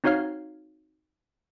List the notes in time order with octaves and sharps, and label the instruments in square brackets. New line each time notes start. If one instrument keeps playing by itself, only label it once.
[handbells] C4 D#4 F#4 C#5 F5 F6